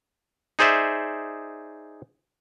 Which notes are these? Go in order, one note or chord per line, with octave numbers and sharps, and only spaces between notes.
D#4 G#4 C5 D5 E5